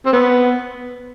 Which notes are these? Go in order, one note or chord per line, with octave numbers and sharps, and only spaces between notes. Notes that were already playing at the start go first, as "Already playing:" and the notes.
C4
B3